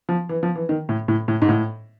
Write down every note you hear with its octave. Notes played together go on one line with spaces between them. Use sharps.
F3
E3
F3
E3
D#3
A2
A2
A2
G#2
A2